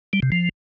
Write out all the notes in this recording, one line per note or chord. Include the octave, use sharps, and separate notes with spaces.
G3
C3
F3